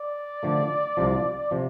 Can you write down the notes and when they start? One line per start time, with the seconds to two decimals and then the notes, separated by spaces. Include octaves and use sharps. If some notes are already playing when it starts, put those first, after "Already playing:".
Already playing: D5
0.43 D3 F3 A3
0.97 C2 C3 F3
1.51 C3 F3